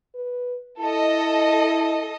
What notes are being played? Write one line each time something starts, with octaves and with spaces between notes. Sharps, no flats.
B4
E4 A4 D#5